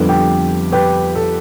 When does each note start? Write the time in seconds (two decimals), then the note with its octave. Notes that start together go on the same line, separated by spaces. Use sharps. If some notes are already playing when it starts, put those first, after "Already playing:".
Already playing: F2 D3 G3 B3
0.09 G4
0.72 G4 B4
1.16 A4